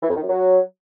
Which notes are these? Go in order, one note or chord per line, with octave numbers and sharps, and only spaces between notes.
E3
F2
D#3
F#2
F#3